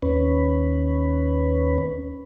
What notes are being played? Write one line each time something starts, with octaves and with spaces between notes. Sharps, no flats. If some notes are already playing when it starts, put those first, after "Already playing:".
D#2 C#4 B4